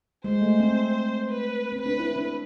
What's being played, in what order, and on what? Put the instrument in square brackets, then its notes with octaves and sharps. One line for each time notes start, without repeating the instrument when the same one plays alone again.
[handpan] G#3 [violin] C5
[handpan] A3
C4
[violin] B4
[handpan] C4
[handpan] D4 [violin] B4
[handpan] E4
D4